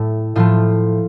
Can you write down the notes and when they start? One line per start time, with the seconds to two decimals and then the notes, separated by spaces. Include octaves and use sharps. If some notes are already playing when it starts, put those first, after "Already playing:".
Already playing: A2 A3
0.35 A2 F3 A3 F4